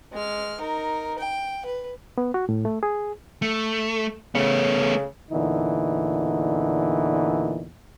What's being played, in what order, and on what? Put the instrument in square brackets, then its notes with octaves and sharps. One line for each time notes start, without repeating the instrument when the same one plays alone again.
[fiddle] G#3 F6
D#4 A#4
G5
B4
[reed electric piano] B3
F#4
A2
A3
G#4
[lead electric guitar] A3
[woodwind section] C#3 [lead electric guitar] A3 B3
[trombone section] E2 A#2 D3 E3 D#4